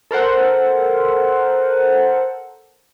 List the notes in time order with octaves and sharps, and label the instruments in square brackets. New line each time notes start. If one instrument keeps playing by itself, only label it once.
[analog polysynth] A4 A#4 C5 F#5